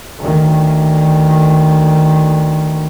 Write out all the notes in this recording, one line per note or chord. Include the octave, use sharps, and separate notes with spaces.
D2 D#3